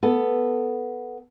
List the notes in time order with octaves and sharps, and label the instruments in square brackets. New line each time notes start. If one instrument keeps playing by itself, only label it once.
[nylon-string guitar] B3 A4